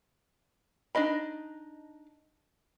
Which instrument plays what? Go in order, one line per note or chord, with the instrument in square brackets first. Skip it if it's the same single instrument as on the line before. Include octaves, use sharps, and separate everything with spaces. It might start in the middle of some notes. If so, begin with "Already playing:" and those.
[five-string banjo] D4 D#4 D#5 B5